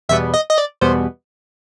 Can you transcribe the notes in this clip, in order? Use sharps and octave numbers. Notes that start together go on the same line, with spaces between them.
E2 B2 G3 B3 E5
D#5
D#5
D5
E2 B2 G3 B3 C5